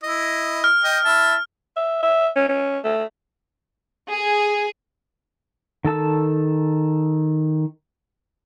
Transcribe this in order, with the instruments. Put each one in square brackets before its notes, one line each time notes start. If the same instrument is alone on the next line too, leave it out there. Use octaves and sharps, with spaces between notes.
[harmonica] E4 D#5
[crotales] F6
[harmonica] D#5 G5
E4 E5 A5
[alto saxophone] E5
E5
C#4
C#4
A3
[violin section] G#4
[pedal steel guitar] D#3 A4 A5 E6